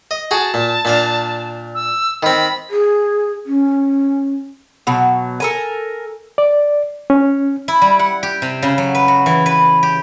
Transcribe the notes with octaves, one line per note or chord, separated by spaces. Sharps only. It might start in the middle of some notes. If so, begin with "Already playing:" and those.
D#5
F#4 G#4 A5
A#2
A#2 D4 F5
E6
D#3 C4 B5
G#4
C#4
B2 F#3
A4 A#4 G#5
D5
C#4
E4
G3
F#5
G4
C3
C#3
F#3
B4
F#4
E3
B4
G4